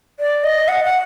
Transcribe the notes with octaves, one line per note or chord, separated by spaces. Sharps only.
D5
D#5
F#5
F#5